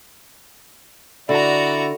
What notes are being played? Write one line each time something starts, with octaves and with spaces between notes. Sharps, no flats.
D3 E4 F#4 D5 A#5